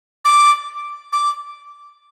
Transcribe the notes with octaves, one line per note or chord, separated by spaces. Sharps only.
D6
D6